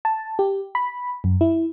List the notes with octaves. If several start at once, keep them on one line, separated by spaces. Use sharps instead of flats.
A5
G4
B5
F#2
E4